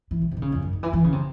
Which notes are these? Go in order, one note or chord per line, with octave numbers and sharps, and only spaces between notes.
E3
C3
C3
D#3
C#3
E2
F#2
D#3
E3
E3
C#3
C3